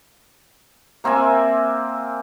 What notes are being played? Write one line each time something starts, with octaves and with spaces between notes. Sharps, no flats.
A#3 C4 E5 G#5